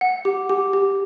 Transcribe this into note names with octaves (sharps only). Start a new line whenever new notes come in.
F#5
G4
G4
G4